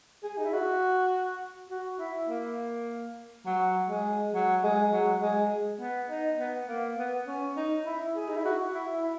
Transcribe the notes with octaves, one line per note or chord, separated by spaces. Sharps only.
G#4
D#4
E4
F#4
F#4
E4
A#3
F#3
G#3
F#3
G#3
F#3
G#3
B3
D#4
B3
A#3
B3
C#4
D#4
E4
G#4
D#4
E4
F#4
E4
E4